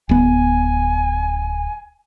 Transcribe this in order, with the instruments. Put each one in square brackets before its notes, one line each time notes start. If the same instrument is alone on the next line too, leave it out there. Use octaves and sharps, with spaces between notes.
[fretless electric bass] D1 B3 [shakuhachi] G#5